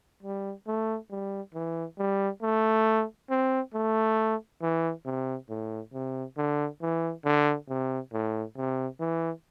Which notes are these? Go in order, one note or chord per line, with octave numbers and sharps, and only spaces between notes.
G3
A3
G3
E3
G3
A3
C4
A3
E3
C3
A2
C3
D3
E3
D3
C3
A2
C3
E3